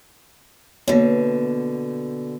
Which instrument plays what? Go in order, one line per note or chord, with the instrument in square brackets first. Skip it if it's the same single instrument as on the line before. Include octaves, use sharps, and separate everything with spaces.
[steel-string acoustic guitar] B2 D3 [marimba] A#3 C#5